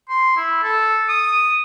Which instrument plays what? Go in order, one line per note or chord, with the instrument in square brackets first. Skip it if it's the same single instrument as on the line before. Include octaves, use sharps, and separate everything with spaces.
[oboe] C6
E4
A4
D#6